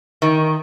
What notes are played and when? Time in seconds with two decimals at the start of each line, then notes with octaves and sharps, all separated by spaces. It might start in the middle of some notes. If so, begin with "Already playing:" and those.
0.22 D#3